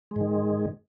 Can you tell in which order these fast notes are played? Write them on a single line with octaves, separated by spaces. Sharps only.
G#3 G#2 D#3